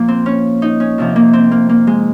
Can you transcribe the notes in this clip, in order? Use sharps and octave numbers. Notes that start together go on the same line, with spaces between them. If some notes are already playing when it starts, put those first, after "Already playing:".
Already playing: A#2 F3 A#3
C4
C#4
D#4
C#4
F2 C3 F3
A#3
C4
A#3
A#3
G#3